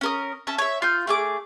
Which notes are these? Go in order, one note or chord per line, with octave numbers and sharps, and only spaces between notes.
C#4 A#4 D#6
C#4 E5 A5
C#5 E5
F4 F6 G6
A3 G#4 D6